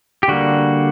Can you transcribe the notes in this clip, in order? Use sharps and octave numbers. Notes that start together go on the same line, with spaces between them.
G4
D3 G3 A#3 F#4